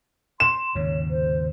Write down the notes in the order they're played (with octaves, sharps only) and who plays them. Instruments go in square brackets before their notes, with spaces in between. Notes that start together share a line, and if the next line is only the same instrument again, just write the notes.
[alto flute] C6 [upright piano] E7
[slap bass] D#2 G#2 C#3 [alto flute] C#5
[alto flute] C5